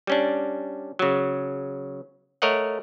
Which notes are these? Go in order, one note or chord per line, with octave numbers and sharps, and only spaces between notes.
G3 C#4 D4
C#3 F#3
A3 A#4 C#5 D#5 F#5